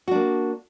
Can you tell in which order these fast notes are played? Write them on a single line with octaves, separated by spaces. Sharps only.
F#4 D4 A#3